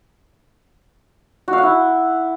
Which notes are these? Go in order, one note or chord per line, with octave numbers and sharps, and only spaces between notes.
F#4
F5
F#5
E4